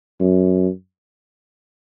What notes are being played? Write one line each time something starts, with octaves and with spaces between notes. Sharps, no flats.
F#2